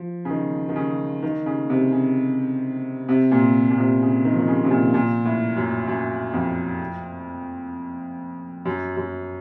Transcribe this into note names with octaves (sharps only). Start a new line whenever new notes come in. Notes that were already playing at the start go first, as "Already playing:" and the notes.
Already playing: F3
C#3
D#3
D#3
C#3
D#3
C#3
C3
C#3
C3
A#2
A#2
C3
C#3
D#3
F3
D#3
C#3
C3
A#2
A#2
A2
F#2
F#2
F2
F#2
F#2